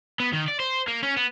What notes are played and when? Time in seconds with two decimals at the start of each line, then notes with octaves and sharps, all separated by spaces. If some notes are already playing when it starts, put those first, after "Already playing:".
0.20 B3
0.33 D#3
0.48 D5
0.60 C5
0.88 A#3
1.03 C#4
1.16 B3